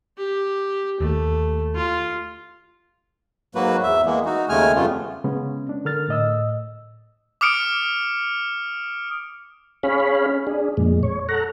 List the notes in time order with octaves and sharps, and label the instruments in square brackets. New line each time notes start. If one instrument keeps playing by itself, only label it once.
[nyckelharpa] G4
[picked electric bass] D#2 [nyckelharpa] A3
[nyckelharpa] F4
[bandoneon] G#2 F#3 A#3 F#4 B4
E2 E5
E3 G#3 A#3 B3
D#4 F#4
D#2 C#3 G#3 A3 G#5 F6
F2 C#3 G3 A3 B3 F4
[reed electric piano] C#3 G#3 B3 C#4
D4
D3 A#4 F6 A6
A2 D#5 E6
[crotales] D6 D#6 F6 C#7 D7
[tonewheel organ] C#4 G#4 C#5 F5 B5
D4 G#4
F2 A#2 G#3
C#5
A4 F#5 A#5